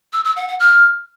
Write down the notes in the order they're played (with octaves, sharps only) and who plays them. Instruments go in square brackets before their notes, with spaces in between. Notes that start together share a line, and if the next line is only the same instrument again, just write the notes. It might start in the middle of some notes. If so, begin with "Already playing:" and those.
[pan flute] E6
E6
F#5
F#5
F6